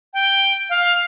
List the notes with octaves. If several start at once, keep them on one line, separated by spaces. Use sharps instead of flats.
G5
F5